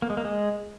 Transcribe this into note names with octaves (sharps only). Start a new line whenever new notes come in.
A#3
G#3
A#3
G#3